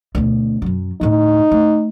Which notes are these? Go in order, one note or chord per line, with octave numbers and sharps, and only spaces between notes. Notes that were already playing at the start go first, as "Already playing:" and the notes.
D2 B2
F#2 F#3
D2 A2 D#4
A3